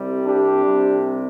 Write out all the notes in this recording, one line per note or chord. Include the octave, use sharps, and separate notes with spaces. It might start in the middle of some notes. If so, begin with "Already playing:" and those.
Already playing: C2 C3 G3
D4 G4
C2 C3 G3